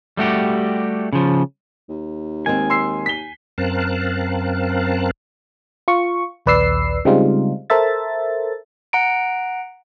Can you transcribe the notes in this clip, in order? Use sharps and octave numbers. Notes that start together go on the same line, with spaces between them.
G3 A3 F#4 G4
C#3 F3
D#2
D#3 G#3 C4 G#5
C6 E6 C7
B6 G7
F#2 C4 A#4 F5 A5 F#6
F4 C#6
A#1 D#2 B4 D5 E6 C7
C#3 G3 G#3 C4 D#4 F4
A4 A#4 C5 E5 A6
F#5 A#5 D7